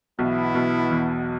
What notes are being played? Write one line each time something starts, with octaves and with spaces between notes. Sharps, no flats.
B1 B2 E3 B3 E4
B1 B2
E2